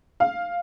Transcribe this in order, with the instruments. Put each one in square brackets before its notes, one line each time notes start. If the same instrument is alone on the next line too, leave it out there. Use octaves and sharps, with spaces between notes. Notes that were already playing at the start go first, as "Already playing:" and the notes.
[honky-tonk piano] F5